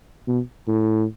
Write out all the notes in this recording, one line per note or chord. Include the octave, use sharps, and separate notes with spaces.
B2
A2